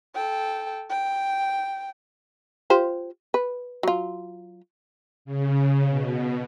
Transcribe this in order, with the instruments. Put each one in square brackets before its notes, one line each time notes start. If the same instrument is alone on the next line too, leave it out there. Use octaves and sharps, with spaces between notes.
[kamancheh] A4 G5
G5
[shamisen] F4 G4 C5
B4
F#3 F4
[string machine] C#3
B2